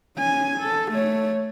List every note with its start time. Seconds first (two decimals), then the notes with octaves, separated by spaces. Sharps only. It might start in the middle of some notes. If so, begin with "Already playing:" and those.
0.17 C#4 G#5
0.59 A4
0.92 A3 C#5